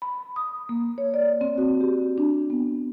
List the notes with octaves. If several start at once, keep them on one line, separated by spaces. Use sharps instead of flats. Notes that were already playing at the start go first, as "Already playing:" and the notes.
B5
D#6
A#3
C#5
D5
C4
F#4
G4
D4
B3